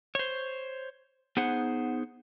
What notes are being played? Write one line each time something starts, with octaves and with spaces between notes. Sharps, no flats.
C5 C#5
B3 D#4 G#4 C5 F#5